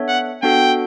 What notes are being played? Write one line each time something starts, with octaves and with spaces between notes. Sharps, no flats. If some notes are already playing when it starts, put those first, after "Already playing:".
Already playing: B3 D4 A4 C#5 E5
F#5
B3 D4 F#4 A4 G5